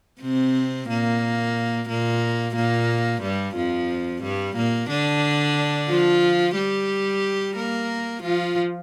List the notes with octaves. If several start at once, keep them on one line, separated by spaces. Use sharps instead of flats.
C3 C4
A#2 A#3
A#2 A#3
A#2 A#3
G2 G3
F2 F3
G2 G3
A#2 A#3
D3 D4
F3 F4
G3 G4
A#3 A#4
F3 F4